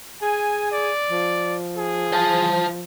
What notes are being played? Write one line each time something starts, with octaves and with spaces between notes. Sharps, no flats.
G#4 G#5
D5
F3
G#4
C5 A5